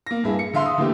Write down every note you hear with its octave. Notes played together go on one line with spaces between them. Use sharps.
A#3 A#6
G2 E4 G#4
C#7
D3 E5 F5 C6
D#6
D3 E3 A3 A#3 G4